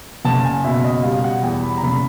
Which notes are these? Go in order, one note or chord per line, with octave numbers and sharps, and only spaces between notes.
F#1 A5
G#5
B2 E5
D#5
G3 F5
F#5
E2 G5
B5
A#5
F#1 B5